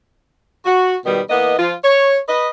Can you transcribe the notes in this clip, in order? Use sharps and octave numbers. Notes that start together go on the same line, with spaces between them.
F#4
G#2 B2 D#3 G3 B3
E3 A#3 B3 D#5
F3 F4
C#5
B4 D#5